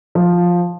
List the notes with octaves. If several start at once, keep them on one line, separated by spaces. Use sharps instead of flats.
F3